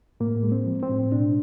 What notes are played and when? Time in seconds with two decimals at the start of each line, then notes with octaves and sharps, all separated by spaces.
0.20 A2 A#3
0.43 G#3
0.52 C4
0.66 F3
0.83 C4
0.89 A2
1.12 B2 D4